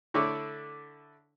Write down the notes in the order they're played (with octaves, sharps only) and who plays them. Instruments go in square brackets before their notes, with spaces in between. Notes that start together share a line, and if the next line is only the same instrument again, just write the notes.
[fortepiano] D3 A3 D4 E4 C#5 D5